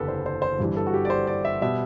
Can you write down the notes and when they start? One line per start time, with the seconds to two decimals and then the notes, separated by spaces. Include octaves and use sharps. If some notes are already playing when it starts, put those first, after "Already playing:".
Already playing: F#1 E2 D3 F#3 G4 A4 B4
0.08 C5
0.26 C5
0.42 C5
0.59 G1 G2 E3 G3
0.77 A4
0.87 F#4
0.94 G4
1.05 D5
1.10 C5
1.27 D5
1.45 E5
1.61 B2 G3 E5